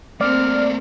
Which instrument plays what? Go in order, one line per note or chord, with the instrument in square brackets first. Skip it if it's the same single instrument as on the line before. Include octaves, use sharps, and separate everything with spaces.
[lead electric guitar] A3 A#3 [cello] C4 [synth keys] D5 [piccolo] F6